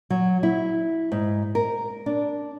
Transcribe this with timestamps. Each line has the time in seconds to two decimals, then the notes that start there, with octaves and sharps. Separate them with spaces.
0.10 F#3
0.43 E4
1.12 G#2
1.55 A#4
2.06 D4